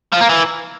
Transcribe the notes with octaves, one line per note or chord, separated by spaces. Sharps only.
F3
A#3
E3